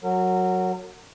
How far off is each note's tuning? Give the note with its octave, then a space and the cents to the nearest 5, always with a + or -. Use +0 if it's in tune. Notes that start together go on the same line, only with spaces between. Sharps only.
F#3 -5 A#4 -30